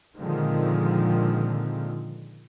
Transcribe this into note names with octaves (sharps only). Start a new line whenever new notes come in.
A#2 D3 D#3 F3 G#3 C4